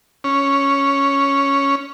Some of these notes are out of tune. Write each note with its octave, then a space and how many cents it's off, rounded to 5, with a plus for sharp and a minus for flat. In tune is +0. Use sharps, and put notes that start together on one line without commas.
C#4 +0